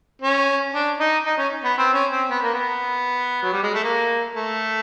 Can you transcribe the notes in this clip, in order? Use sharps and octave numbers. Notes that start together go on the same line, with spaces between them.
C#4
D4
D#4
D#4
C#4
B3
C4
C#4
C4
B3
A#3
B3
F#3
G3
G#3
A3
A#3
A3